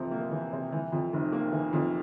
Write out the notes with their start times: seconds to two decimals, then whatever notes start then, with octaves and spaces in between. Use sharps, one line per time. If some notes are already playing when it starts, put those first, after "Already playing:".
Already playing: F2 C3 E3
0.11 A#3
0.31 E3
0.53 C3
0.72 E3
0.92 F2
1.13 F1
1.32 A#3
1.53 E3
1.73 F2